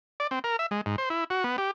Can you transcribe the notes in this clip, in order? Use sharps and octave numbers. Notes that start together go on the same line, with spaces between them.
D5
C4
A#4
E5
G#3
G#2
C5
E4
F#4
B3
G4